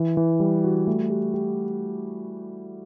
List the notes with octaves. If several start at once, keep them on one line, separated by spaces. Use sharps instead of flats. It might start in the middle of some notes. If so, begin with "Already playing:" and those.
Already playing: E3
E3
G3
F#4
A3
G4
G4